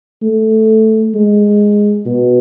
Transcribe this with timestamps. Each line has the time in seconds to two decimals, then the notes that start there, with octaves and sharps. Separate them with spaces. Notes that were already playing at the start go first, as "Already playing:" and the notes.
0.23 A3
1.14 G#3
2.06 B2